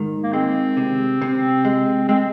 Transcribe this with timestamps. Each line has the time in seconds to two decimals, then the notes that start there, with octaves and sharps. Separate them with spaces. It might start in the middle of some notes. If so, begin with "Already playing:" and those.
Already playing: G#2 D#3
0.23 A#3
0.33 G#3 C4
0.77 C3
1.22 C3
1.65 G#3
2.09 G#3 C4